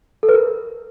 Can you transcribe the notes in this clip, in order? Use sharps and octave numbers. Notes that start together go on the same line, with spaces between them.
A4
B4
A#4